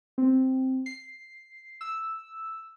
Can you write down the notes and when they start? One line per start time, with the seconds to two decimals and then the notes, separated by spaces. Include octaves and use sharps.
0.18 C4
0.86 C7
1.81 E6